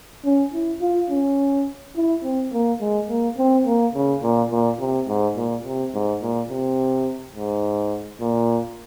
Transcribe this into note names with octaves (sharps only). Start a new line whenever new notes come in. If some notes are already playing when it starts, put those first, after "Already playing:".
C#4
E4
F4
C#4
E4
C4
A#3
G#3
A#3
C4
A#3
C#3
A#2
A#2
C3
G#2
A#2
C3
G#2
A#2
C3
G#2
A#2